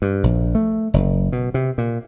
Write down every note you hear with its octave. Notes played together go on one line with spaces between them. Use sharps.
G2
A#1
A3
F#1
B2
C3
A#2